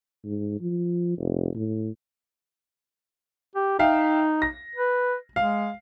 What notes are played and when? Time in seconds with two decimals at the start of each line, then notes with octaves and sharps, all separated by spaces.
0.24 G#2
0.61 F3
1.18 F1
1.55 A2
3.56 G4
3.79 D#4 E5 F5 G5
4.42 A#6
4.75 B4
5.36 G#3 F5